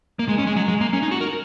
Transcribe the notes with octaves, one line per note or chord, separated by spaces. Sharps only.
A#3
G#3
C#4
G#3
F#3
G#3
A#3
C#4
D#4
F#4
A#4